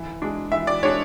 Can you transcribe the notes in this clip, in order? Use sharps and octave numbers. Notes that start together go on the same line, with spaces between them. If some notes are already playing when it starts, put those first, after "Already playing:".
Already playing: E3
G#3 D4
E3 E5
D5
G#3 D4 C#5